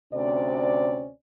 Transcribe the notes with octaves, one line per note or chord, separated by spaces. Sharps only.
D2 C3 C4 C#4 D5